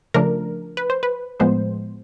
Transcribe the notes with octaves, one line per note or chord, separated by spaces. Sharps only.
C#3 F3 A3 D4 A#4
B4
C5
B4
A2 F3 G#3 B3 C5